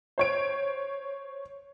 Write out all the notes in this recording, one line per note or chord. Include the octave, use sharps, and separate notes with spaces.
C5 C#5 D7